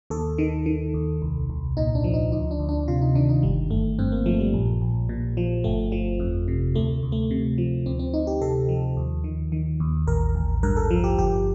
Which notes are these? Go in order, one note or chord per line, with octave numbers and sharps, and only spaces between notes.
D#2 A4
D#3
D#3
D#2
C2
C2
A#2 D#4
D4
F3
D#4
D2 D#4
D4
D2
D4
C3 F4
D#4
D#3 D4
D#4
G1 G3
G1 A3
G2 C4
A#3
F3 A3
G3
A#1
A#1
A#2
F3
G1 A3
F3
F2
C3
D2 A3
D2
A3
C3
F3
D2 C4
C4
D2 D#4
G4
C3 A4
F3
D#2
D#3
D#3
D#2
A1 A#4
A1
G2 A#4
A4
F3
G4
G1 G4